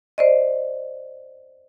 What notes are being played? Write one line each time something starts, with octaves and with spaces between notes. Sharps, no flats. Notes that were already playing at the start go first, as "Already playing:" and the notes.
C5 D5 D#5